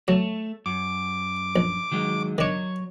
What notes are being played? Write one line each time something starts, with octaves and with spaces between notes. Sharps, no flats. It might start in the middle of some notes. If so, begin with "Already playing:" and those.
F#3 A3
F#2 D6
A#1
D#3 F#3 G#3
D#3 F#3 D4 C#5